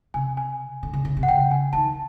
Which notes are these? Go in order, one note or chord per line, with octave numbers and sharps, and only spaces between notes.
C3 G#5
G#5
D3
C#3
C#3
C3
F#5
C#3 G5
G#5
D#3 A5